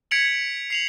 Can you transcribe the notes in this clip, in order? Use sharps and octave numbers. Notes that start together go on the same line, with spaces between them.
G#6 B6 C#7 D7 F7 F#7
C7 F7 F#7